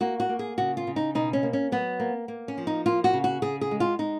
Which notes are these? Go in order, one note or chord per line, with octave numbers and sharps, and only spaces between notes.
A#3 F#4
F#4
A#3
G#4
C#3 F#4
F4
C#3
D#4
B2 D#4
C#4
A#3
C#4
F#3 B3
A#3
A#3
C#4
F3
D#4
A#3 F4
F#4
C#3
F#4
C#3 G#4
G#4
G#3
F4
G#3 D#4